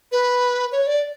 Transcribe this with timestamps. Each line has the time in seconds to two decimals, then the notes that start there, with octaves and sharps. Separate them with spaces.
0.12 B4
0.72 C#5
0.87 D5